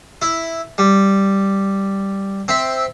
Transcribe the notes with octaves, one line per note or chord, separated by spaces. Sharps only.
E4
G3
C4 E5